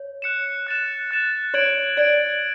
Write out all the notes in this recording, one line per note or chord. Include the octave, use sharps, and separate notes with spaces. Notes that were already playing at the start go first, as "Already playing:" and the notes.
Already playing: C#5
F#6 C#7 E7
F#6 A6 E7
F#6 A6 E7
C#5 G#6 D7 F#7
D5 G#6 D7 F#7